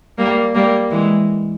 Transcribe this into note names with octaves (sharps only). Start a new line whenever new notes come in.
G3 A#3
G3 A#3
E3 G#3